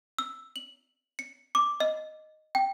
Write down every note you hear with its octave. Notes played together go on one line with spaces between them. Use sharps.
E6
F#7
C#7
D6
D#5
G5